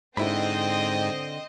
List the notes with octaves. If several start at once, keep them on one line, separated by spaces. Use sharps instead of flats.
G#2 D3 C4 E4 C5 D#5 B5